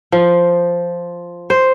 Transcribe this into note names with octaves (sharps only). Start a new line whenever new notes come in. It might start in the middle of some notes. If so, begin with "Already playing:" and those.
F3
C5